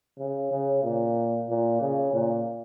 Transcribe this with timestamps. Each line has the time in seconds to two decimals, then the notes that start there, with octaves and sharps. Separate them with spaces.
0.18 C#3
0.51 C#3
0.83 A#2
1.49 A#2
1.81 C#3
2.13 A#2